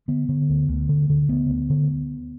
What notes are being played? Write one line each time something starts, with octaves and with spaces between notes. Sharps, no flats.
D3 B3
D3
D2
D2
D3
D3
D2 B3
D2
D3